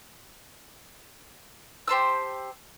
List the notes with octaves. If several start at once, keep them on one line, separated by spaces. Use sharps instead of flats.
G4 C5 A5 E6